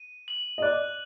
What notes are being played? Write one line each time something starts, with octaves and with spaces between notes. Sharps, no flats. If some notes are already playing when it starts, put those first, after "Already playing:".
Already playing: D#7
F#7
D#5
D5 F#6